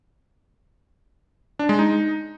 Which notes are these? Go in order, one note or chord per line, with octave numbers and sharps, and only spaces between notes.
D4
G#3
D#4